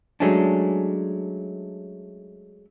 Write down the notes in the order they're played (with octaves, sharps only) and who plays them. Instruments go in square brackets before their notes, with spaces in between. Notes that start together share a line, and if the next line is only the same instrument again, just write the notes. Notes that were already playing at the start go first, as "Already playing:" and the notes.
[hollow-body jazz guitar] F#3 G#3 A3 C#4 D4